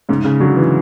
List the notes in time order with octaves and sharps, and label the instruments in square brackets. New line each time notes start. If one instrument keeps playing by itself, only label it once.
[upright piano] G#2 [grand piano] C#3
[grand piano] C#3
[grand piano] D3 [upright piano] F#3
[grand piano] E3